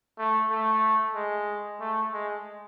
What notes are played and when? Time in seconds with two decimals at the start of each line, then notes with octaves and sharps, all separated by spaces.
0.18 A3
0.50 A3
1.15 G#3
1.80 A3
2.13 G#3